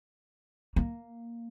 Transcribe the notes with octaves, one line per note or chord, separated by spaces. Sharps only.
A#3